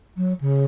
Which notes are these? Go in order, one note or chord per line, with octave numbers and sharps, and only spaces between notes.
F#3
C#3